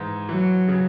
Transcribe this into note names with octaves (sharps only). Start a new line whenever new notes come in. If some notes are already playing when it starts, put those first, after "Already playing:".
Already playing: G#2 E3
E3 F#3
C#3